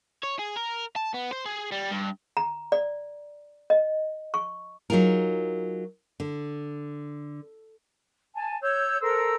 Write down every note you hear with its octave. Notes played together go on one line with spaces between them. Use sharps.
C#5
G#4
A#4
A5
B3
C5
G#4
G3
G2
A#5
D5
D#5
C#6
F#3 D#4 F4 G#4 A#4
D3
G#5 A5
C#5 E6 G6
A4 A#4 C5 E6